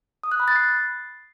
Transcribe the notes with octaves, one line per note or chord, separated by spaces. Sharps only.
D#6
F#6
B5
A6
C7